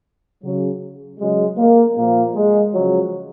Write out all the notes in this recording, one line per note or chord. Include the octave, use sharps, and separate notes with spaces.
C#3 F#3
C#3 F#3 G#3
A#3
A#2 F3 A#3
G#3
C#3 F3 F#3